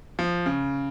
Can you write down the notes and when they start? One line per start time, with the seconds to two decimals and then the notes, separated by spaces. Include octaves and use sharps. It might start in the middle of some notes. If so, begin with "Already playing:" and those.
0.19 F3
0.46 C#3